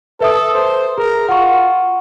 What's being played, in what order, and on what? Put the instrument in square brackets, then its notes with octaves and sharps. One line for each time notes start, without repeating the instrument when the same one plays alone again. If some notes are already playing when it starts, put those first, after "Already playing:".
[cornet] A4 [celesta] B4 E5 D#6
[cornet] C5
[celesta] G#4 [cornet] A#4
[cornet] F4 [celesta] F#5 C#6